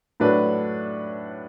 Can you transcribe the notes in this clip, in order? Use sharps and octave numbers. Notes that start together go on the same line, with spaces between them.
A2 F#3 D4 B4